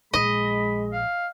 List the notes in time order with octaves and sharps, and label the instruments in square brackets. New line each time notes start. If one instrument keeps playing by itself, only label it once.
[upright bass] A#1 [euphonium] G#3 [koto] D#5 [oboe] B5
[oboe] F5